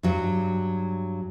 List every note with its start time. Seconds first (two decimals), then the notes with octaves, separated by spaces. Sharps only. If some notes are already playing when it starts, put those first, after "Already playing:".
0.03 G2 F#3